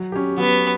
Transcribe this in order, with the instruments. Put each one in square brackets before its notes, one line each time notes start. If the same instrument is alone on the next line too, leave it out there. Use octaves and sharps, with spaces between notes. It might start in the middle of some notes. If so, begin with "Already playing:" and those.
Already playing: [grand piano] F#3
C#4 G4
[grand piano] F#3 [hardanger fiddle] B3